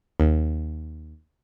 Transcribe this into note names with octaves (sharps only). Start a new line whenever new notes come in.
D#2